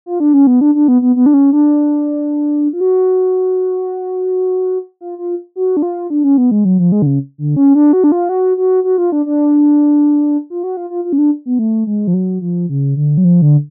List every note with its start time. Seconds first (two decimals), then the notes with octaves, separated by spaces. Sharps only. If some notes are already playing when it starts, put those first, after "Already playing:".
0.06 F4
0.20 D4
0.34 C#4
0.47 B3
0.61 D4
0.75 D4
0.88 B3
1.02 B3
1.16 B3
1.26 D4
1.34 C#4
1.53 D4
2.73 F4
2.81 F#4
5.01 F4
5.18 F4
5.56 F#4
5.77 D4
5.82 F4
6.10 D4
6.24 C#4
6.38 B3
6.51 G#3
6.65 F#3
6.79 F3
6.92 G#3
7.02 D3
7.06 C#3
7.38 D3
7.56 C#4
7.75 D4
7.93 F#4
8.04 D4
8.12 F4
8.29 F#4
8.57 F#4
8.84 F#4
8.98 F4
9.12 D4
9.26 D4
10.50 F4
10.64 F#4
10.77 F4
10.90 F4
11.05 F4
11.13 C#4
11.18 D4
11.46 B3
11.59 A3
11.87 G#3
12.07 F3
12.14 F#3
12.41 F3
12.69 C#3
12.96 D3
13.17 F#3
13.24 F3
13.42 D3